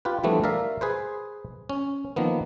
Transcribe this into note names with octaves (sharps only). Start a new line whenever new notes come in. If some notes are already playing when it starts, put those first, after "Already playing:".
F4 G4 B4
E3 F3 G3 A3 B3 D4
A#4 D5 E5 F5
G#4 B4 C5
C#4
D#3 F3 A#3 B3